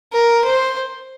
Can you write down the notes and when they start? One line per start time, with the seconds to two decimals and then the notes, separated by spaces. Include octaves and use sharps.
0.13 A#4
0.45 C5